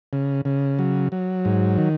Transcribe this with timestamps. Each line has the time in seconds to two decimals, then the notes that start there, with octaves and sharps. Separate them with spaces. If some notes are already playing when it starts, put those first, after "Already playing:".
0.13 C#3
0.45 C#3
0.79 F#3
1.12 F#3
1.45 G#2
1.78 D#3